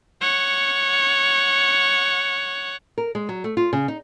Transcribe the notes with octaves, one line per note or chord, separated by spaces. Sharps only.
C#5 F#5
A#4
G#3
F#3
A3
F4
C#3
D#4